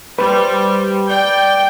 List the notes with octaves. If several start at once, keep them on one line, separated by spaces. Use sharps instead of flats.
G3 B4 C5
D5 G5